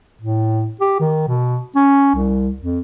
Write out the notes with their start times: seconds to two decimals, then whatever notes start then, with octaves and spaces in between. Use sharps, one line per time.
0.21 A2
0.81 G4
1.00 D#3
1.28 B2
1.76 C#4
2.15 C2
2.62 F2